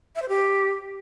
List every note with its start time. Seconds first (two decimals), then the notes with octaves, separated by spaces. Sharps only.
0.16 E5
0.22 C5
0.29 G4